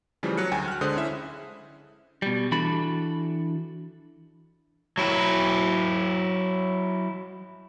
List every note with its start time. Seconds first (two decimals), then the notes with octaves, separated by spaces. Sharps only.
0.23 C#3 E3 F3 G3 A3
0.38 F#3 F#6 C#7
0.52 D2 G5 G#5
0.68 F6 F#6
0.81 D3 G#3 C5 D#6 F#6
0.96 C#4 E4 E5
2.22 B2 G3
2.52 E3 D4 F#4 A4 B5
4.98 F#3 E4